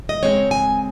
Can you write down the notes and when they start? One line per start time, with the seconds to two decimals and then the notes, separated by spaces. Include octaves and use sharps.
0.09 D#5
0.23 C#3 G#3 C4 C#5
0.51 G#5